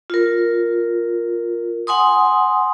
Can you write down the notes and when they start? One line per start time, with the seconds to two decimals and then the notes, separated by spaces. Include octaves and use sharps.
0.10 F4 A#4
1.87 F#5 G#5 C6 D#6